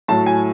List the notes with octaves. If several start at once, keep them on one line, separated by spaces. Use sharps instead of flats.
A2 F#3 A5
G#5